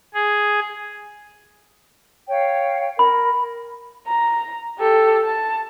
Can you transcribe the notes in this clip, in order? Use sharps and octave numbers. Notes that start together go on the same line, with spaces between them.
G#4
C#5 F5 G5
A#4 B5
A#5
G4 A4
A5